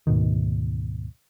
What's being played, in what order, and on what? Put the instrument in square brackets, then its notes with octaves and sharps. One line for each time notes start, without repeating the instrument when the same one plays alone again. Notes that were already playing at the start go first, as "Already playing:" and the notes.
[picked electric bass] D2 G#2 B2 D#3